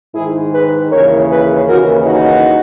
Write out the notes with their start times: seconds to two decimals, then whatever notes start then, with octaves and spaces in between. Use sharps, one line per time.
0.14 G#2 D#3 E4 G#4
0.52 G#4 B4
0.91 D#2 C#3 E3 A#4 C#5
1.29 G#4 B4
1.67 D#2 C#3 E3 F#4 A#4
2.06 D#4 F#4